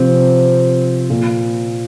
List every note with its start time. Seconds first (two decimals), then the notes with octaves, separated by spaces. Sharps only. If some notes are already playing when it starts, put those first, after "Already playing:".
Already playing: C3 F3 C4 F4
1.10 A#2